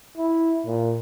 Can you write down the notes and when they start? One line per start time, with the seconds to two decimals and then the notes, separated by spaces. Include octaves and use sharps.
0.17 E4
0.66 A#2